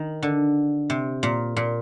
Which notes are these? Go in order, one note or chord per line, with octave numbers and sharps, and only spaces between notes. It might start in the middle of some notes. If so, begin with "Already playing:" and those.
Already playing: D#3
D3
C3
A#2
A#2